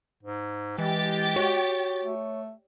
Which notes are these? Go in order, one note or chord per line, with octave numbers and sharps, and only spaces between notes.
G#2
E3 G#3 G4 G5 A6
F#4 C#5
A3